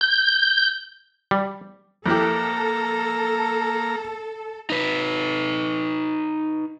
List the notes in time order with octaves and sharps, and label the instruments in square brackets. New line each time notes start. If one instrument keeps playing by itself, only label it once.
[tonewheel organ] G6
[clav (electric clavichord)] G3
[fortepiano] F2 E4 G4 [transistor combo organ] A#3 A#5 [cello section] A4
[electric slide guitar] D#4 B4